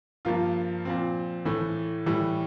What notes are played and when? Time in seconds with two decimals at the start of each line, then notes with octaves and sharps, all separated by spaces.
0.25 G2 F3 A#3 F4
0.85 A#2 F3 C4
1.45 A2 E3 A3
2.06 A2 E3 G3